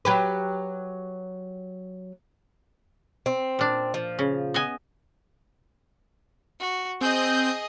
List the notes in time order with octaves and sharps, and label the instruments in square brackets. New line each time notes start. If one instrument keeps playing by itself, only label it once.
[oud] F#3 G4 B4
[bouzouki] C4
[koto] A#2 D4
[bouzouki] F3
[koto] C#3
B3 D#5 G#5
[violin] F#4
[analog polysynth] C4 G6 [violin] G#4 D#5